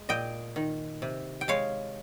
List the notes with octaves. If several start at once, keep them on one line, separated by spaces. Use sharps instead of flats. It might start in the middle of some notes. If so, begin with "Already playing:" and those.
Already playing: G#3
A#2 D#5 G5
D#3
C3
G5
G#3 C#5 F5